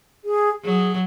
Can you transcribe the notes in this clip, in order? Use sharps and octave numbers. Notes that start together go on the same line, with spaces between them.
G#4
F#3 G#4